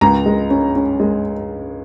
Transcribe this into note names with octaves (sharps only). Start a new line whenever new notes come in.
C#2 A#5
G#3
C#4
C#4
G#3